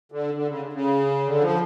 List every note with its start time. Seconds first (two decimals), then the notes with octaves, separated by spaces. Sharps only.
0.12 D3
0.34 D3
0.48 C#3
0.73 C#3
1.26 D3
1.41 F3